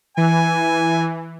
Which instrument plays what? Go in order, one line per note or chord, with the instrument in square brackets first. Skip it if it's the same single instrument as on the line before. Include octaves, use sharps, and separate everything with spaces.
[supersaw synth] E3 [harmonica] G#5